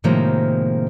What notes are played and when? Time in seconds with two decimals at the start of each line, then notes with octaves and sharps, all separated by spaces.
0.04 A2 C3 D#3 F3 G#3 A#3